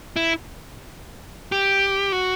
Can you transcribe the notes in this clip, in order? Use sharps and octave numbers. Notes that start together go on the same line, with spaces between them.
E4
G4
F#4